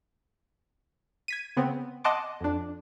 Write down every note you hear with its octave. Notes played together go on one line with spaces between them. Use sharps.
G#6 B6 D#7
C#3 B3 C4
D#5 F#5 A5 C6 D6
F2 D4